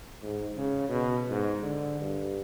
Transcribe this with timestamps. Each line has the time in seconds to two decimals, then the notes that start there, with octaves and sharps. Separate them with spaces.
0.22 G#2
0.57 C#3
0.89 B2
1.30 G#2
1.62 D3
2.01 G2